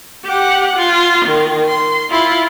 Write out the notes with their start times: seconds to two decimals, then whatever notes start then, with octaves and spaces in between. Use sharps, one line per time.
0.25 G4 F#5
0.76 F4
1.26 D#3
1.68 C6
2.11 E4 F4